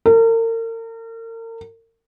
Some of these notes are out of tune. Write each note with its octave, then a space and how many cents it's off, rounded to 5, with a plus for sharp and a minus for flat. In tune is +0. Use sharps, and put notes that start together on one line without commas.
A#4 -40